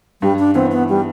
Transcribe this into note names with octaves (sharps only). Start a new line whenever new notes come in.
G2 G3
D4
E3 B3 C4
B3
G3